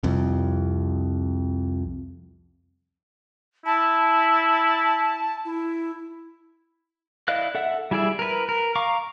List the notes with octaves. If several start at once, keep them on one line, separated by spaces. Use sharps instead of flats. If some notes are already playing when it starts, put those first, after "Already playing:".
C2 F2
E4 A5
E4
E4 D5 D#5 F5 F#6
A4 E5 F#5
G3 E4 G#4 D5 E5
A#4 B4
A#4
F5 A#5 C#6 D6